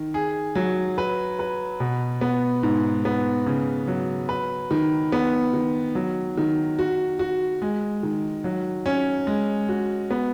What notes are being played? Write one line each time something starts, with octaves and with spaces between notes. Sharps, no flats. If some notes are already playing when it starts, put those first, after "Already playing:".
Already playing: D#3
G#4
F#3
B4
B4
B2
B3
G#2
B3
C#3
F#3
B4
D#3
B3
D#3
F#3
D#3
F#4
F#4
G#3
D#3
F#3
C#4
G#3
F#4
B3